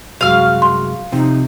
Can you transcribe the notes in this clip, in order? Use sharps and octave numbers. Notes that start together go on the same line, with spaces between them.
C2 F#2 G#3 F#4 F5 F6
C6
C3 F3 D#4